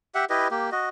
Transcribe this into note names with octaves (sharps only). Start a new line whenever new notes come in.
G4 E5 F#5
E4 G4 B4 D#5
A#3 G4
F#4 D#5